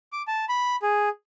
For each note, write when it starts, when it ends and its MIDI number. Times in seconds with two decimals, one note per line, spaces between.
0.12 0.22 86
0.28 0.45 81
0.49 0.76 83
0.82 1.09 68